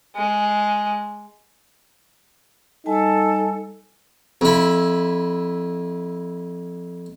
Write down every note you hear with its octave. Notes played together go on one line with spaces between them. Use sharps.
G#3
G3 D#4 A4 G#5 A5
F2 E4